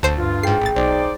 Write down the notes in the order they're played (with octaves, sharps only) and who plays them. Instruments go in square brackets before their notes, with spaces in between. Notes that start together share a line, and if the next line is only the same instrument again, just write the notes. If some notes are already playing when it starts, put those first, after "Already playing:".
[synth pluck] D2 C5 C7 [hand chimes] A5
[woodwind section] G2 F4
[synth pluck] G#2 C7 [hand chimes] G#4 G5
[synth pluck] A1 A6
[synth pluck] B1 [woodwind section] D#4 C5 D5